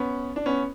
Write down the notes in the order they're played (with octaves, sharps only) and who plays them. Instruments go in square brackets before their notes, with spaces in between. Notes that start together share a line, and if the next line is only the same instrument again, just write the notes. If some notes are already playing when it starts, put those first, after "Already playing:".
Already playing: [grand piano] B3 C#4
D4
B3 C#4